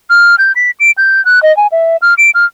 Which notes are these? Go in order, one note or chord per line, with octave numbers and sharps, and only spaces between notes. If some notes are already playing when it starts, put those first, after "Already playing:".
F6
G6
B6
D7
G6
F#6
D#5
G#5
E5
F6
D7
F6